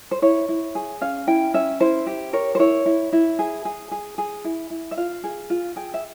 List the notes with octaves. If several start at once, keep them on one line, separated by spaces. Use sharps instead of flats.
C5
E4 C#5
E4
G#4
C#4 F5
E4 G5
C#4 E5
E4 C5
G4
A#4 C#5
C5
E4 C#5
E4
E4
G#4
G#4
G#4
G#4
E4
E4
E5
F4 F5
G#4
F4
G#4 G5
E5